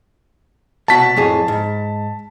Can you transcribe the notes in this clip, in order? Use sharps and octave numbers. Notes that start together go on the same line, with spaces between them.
C2 B2 F#4 A5 B6
F2 A2 G#4
G#2